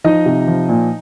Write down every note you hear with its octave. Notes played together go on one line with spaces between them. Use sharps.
F3 D#4 D#5
C3
F3
A#2